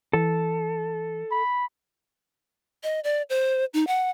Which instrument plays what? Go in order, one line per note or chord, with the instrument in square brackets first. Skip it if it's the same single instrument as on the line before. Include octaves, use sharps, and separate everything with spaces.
[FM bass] E3 [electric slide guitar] A4
[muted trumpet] B5
[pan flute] D#5
D5
C5
D#4
F#5